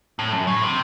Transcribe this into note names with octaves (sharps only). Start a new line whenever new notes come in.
A2
F#2
A2
C3